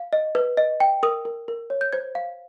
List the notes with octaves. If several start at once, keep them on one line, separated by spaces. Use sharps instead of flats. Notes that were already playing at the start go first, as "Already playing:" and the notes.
Already playing: F5
D#5
B4
D#5
G5
A#4 D#6
A#4
A#4
C#5
G6
C5 G#6
F5